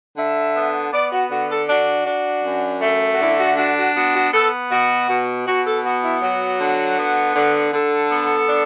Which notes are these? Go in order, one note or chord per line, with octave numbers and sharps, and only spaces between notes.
D3 E5
B3
B3 D5
F#4
D3 F#4
A4
D4 F#4
D4
F#2
A3
F#4
D3 E4
F#4
D4 F#4
F#4
B3 F#4
F#4
B3 A4
B2 F#4
B2
B2 F#4
A4
B3 F#4
E4
F#3 F#4
D3
B3
D3
D3 A4
B3
D4